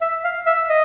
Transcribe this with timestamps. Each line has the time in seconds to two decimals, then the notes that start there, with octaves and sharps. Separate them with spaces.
0.01 E5
0.24 F5
0.46 E5
0.69 D#5